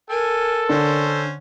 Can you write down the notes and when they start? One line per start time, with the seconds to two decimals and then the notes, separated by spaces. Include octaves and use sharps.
0.10 A4 A#4 G#5
0.69 D3 C#4 C5